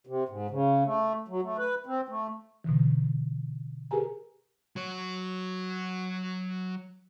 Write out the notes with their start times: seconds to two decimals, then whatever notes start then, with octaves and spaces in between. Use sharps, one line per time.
0.07 C3
0.29 G#2
0.50 C#3
0.85 A3
1.28 F#3
1.42 A3
1.58 B4
1.86 C4
2.09 A3
2.64 B2 D3 E3
3.91 G4 G#4 A#4 B4 G#5 A#5
4.76 F#3 C#5